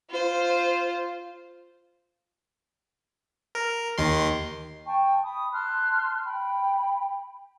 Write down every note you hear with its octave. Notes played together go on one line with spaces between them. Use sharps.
F4 C5
A#4
D#2 D#3 C6
G5 A5 C#6
B5 D#6
A5 C6 F6 F#6
G5 B5